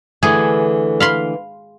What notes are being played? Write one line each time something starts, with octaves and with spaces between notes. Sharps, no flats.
D3 E3 A3 G#4
F5 B5 C6